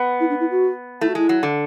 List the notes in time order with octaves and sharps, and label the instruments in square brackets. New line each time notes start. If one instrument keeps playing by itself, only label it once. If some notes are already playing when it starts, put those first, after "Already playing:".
Already playing: [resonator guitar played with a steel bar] B3
[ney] E4
D4
E4
F#4
[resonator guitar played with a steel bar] A3 [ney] E4
[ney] F#4
[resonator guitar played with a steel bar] G#3 [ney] E4
[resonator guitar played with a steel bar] F#3
D3